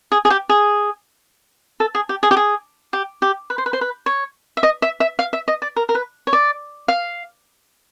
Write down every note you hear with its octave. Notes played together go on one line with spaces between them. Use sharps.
G#4
G#4
G4
G#4
A4
G#4
G4
G#4
G4
G#4
G4
G4
B4
C5
B4
C5
B4
C#5
E5
D#5
E5
E5
F5
E5
D#5
D5
A#4
A#4
B4
C#5
D5
F5